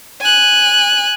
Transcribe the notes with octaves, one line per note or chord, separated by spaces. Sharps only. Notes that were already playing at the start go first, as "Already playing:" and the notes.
G#5 F#6